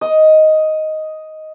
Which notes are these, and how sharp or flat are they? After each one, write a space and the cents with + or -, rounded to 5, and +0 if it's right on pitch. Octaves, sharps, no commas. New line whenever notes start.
D#5 +5